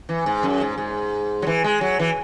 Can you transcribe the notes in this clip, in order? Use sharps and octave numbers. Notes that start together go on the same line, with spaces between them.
E3
G#2
F#2
G#2
G#2
F#3
E3
G#3
F#3
E3